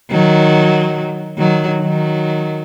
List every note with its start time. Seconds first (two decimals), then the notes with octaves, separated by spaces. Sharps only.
0.11 D#3 F#3
1.38 D#3 F#3
1.81 D#3 F#3